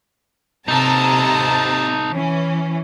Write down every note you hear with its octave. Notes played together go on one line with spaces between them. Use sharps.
C3 D#4 A4 A5 A#5
E3 C#4